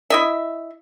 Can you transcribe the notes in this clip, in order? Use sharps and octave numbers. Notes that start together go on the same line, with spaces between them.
E4 D#5 E5